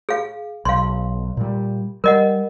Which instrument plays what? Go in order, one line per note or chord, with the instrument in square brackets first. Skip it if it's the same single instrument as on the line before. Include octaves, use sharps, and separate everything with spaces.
[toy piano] G#4 F5
[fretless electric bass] B1 [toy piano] F5 C6
[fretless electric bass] A#2 G3
[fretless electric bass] G3 [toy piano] A#4 D#5 F#5